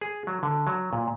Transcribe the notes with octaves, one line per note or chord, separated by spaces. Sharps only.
G#4
F#3
D3
F#3
A#2